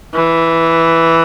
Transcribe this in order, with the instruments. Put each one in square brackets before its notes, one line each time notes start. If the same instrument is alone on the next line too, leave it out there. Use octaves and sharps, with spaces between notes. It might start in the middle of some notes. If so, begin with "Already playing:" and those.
[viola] E3